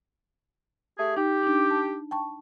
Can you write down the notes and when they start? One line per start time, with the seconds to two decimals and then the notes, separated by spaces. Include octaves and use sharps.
0.98 A3 G4 G#4
1.17 D#4 G4
1.43 D4 D#4
1.70 A5
2.11 G5 A5 C#6